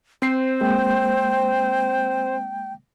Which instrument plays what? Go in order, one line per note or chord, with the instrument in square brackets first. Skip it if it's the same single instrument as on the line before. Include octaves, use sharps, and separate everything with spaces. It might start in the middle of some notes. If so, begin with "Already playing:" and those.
[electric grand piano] C4 C7 [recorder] C5
[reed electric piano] G#3 A#3 [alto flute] G5